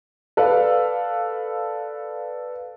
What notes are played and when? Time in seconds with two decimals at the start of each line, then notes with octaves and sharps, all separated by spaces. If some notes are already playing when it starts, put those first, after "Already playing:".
0.37 A4 B4 D5 F5